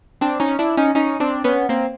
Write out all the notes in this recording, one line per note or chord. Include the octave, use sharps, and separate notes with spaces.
C4 D4
C#4 D#4
D4 E4
C#4 D#4
C#4 D#4
C4 D4
B3 C#4
A#3 C4